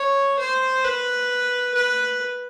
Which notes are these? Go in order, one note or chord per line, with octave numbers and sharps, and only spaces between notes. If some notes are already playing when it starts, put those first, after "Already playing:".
Already playing: C#5
C5
B4
B4